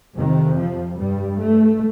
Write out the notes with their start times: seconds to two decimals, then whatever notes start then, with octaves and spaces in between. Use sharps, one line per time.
0.18 F2 C3 D#3
0.58 F3
0.99 G2 G3
1.40 A3